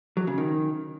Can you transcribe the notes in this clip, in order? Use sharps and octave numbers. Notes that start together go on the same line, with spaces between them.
F#3
C#3
D#3